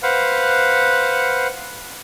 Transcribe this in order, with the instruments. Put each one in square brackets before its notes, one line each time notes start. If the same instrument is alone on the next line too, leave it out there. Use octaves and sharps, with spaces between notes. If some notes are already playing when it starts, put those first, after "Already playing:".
[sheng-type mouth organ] B4 C5 F5 F#5